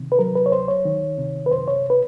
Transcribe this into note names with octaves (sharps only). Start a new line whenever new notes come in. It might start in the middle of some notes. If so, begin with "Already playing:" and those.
Already playing: C3 D#3
B4
F#3 A#4
B4
C#5
D2 C5
C#5
D#3
C3
B4
F#2 C5
C#5
B4